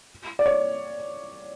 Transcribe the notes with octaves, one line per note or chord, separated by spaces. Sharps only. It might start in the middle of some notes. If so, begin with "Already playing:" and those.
D5
C#5